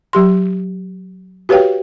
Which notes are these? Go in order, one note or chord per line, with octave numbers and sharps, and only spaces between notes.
F#3 G4 C6
F#4 G4 B4 C#5 F5 G5